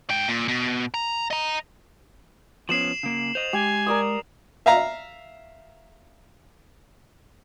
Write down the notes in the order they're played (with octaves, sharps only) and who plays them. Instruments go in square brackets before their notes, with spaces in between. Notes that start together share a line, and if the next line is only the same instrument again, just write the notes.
[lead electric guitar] G#2 G5
A#2
B2
A#5
D#5 A#5
[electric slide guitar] F3 B3 C#4 [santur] D6 [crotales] C7 E7 F#7
[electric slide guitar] C#3 A#3
[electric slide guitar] C5 D#5 [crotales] F7
[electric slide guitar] G#3 [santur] G4 [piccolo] G#5
[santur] A#4 D5 D#6
[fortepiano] E5 F5 A#5